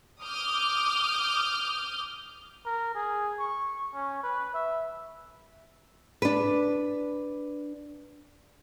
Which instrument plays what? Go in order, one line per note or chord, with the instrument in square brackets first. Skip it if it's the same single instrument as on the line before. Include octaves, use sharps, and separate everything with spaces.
[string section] D6 D#6 F6 G6
[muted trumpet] A#4
G#4
C#6
C#4
B4
E5
[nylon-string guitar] D4 B4